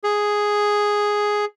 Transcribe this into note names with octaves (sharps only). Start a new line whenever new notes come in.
G#4